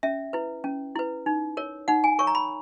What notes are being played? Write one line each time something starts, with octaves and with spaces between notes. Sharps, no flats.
C#4 E5
E4 B4
C#4
E4 B4
D#4
A#4 C#5
D#4 F#5
G#5
A#4 C#5 C#6
A#5
B5